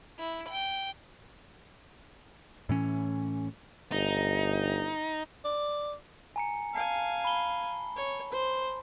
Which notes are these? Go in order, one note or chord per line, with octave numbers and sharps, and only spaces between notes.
E4
G5
A2 E3 C#4
G1 D#4
D5
G#5 A#5 C#7
F5 G#5 A5 C7
B5 G7
C#5
C5